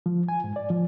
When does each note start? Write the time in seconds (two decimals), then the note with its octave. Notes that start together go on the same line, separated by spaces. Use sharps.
0.06 F3
0.29 G#5
0.44 G#2
0.56 D5
0.70 F3